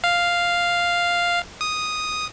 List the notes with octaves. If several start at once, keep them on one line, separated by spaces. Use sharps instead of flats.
F5
D#6